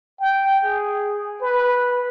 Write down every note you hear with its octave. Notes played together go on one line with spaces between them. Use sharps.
G5
G#4
B4